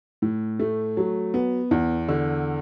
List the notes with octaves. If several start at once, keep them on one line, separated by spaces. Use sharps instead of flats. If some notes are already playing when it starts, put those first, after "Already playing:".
A2
A3
F#3
B3
E2
D3